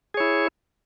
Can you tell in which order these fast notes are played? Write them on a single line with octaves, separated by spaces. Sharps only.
G#4 C#5 E4